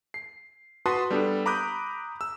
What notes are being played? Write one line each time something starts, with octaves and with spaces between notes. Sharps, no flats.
C7
F#4 B4 A5 C6 D#6
G3 B3 D4 A4
A#5 B5 D6 D#6 F#6 G6
E6